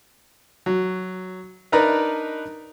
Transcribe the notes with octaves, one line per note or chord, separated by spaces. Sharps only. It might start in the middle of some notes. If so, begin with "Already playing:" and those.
F#3
D4 D#4 A#4 B4 D5 A#5